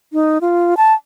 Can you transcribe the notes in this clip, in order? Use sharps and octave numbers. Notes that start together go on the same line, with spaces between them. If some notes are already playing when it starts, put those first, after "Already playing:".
D#4
F4
A5